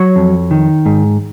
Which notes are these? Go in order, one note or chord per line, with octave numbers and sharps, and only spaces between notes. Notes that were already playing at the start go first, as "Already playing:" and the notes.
Already playing: F#3 C#5
F2
D#3
G#2